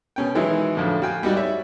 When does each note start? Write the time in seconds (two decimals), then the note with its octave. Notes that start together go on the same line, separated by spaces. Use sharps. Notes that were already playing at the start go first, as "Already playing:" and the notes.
0.16 B2 C#4 G5
0.35 D#3 E3 F#3 G#3 E4
0.75 F2 A2 D3
1.02 F#4 F5 G5 G#5
1.23 G3 D#4 F#4 D5
1.36 C#5 E5